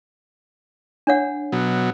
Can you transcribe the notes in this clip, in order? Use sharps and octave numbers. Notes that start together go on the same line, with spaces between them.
D4 C#5 F#5
B2 F#3